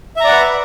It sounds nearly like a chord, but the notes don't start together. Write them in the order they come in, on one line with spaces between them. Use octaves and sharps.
E5 A#5 D5 F#5 B4